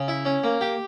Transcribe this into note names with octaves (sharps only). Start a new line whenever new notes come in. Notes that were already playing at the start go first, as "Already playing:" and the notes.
Already playing: C#3
E4
C#4
A#3
G4